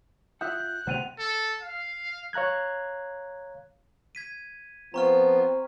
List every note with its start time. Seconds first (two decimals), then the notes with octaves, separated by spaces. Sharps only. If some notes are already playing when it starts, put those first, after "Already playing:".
0.41 F4 E5 F#5 D#6 F#6 G6
0.60 G6
0.87 C3 A3 B3 C5 F#5 G5 D#7 F7
1.19 A4
1.62 F5
2.33 C#5 F5 A#5 F#6 G#6
4.15 G#6 B6 D#7
4.94 F3 B3 C4 F4 A#5 C#6 F6